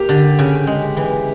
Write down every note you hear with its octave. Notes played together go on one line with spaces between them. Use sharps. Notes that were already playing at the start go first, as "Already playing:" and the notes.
Already playing: A#3 G4
D3
C#3
G#3
E3